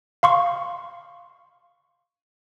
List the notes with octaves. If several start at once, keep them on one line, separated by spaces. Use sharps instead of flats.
F5 C6 C#6